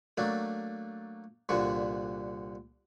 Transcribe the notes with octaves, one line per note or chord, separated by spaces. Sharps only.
F#3 A3 A#3 D4
C2 A#2 D3 F#4 C#6